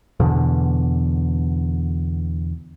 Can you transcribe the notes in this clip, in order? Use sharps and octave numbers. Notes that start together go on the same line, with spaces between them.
E2 B2 D3